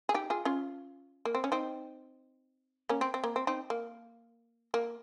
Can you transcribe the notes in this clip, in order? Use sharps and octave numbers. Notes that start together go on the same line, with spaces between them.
G#4
D#4 G4
F4 G#4
C#4 F4
A#3
C4
C#4
C4 D#4
A#3 C#4
C4
C4
A#3
C4
C4 D#4
A#3
A#3